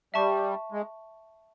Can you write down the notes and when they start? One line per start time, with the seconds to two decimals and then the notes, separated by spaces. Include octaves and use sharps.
0.14 G3 E5 A5 C#6
0.72 G#3